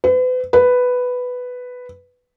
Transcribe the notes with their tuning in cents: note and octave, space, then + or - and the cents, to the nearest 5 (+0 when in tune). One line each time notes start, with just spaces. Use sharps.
B4 +40
B4 +5